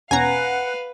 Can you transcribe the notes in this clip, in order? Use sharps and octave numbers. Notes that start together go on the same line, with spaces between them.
E2 B2 C#4 B4 F5 F#5 G#5 A#5